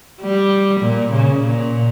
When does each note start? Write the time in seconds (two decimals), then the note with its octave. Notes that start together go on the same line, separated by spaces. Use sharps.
0.21 G3
0.81 A#2
1.12 C#3
1.44 A#2